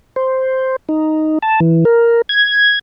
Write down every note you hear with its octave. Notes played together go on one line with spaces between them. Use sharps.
C5
D#4
A5
E3
A#4
G#6